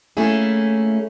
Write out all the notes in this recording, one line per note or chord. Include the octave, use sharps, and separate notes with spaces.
A3 A#3 C#4 E4 G#4